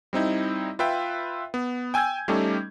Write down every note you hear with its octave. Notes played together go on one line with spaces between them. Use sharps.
G3 C4 D#4 E4
F4 B4 E5 G5
B3
G5 G#5 E6 G6 G#6
G3 A3 C#4 D#4 G4 A4